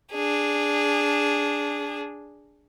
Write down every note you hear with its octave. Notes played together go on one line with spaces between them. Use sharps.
D4 G#4